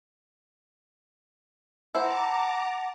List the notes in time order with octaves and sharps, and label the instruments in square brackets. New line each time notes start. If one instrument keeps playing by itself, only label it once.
[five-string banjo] E4 C5 [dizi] F#5 [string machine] A5 A#5 D6